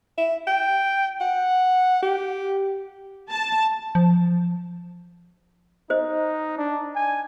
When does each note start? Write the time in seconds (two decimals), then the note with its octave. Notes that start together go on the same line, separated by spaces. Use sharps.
0.17 E5
0.47 G5
1.20 F#5
2.02 G4
3.30 A5
3.95 F3
5.90 D#4 C5 D#5
6.57 D4
6.96 G#5